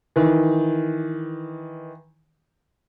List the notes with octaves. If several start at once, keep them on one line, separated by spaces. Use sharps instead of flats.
D#3 E3